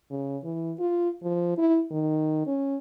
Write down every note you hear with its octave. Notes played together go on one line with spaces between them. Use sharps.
C#3
E3
F4
F3
E4
D#3
C#4